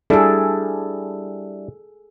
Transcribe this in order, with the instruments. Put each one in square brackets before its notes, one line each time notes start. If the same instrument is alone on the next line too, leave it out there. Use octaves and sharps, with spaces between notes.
[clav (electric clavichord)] G3 D4 E4 [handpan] G#4 A4